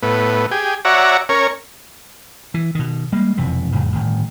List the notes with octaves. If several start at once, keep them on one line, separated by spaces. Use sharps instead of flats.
A2 B3
G4 G#4
F#4 C#5 D5 E5 F#5 A#5
C#4 A#4 C#5
E3
B2 D#3
G3 G#3 A#3
E1 F2 C3 E3
F1 F2 A2 C#3
G1 A2 D#3